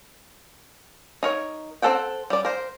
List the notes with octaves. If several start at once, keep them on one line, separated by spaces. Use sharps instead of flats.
D#4 A#4 C#5
C4 D#4 A4 F#5 G5
G3 D5
A#4 C5